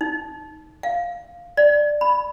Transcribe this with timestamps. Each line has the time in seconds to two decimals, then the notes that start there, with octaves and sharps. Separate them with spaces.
0.01 D#4
0.83 F5
1.57 D5
2.01 B5